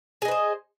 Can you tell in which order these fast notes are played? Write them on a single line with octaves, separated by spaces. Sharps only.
G#4 D#5 B4 C5